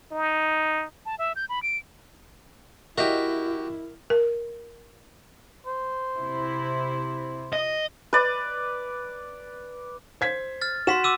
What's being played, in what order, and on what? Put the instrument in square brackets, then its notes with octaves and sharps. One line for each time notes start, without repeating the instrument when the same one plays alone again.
[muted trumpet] D#4
[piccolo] A5
E5
G6
B5
D7
[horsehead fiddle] E4 [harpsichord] F#4 G4 [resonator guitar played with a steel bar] A#4 D#5 E5
[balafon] A#4
[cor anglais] C5
[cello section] C3 E4
[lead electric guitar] D#5
[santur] B4 D5
[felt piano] C5 G#6 B6
[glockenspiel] F6 A6
[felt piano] F#4 F#5 [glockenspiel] C6 B6 E7
[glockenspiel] D6 E6 D#7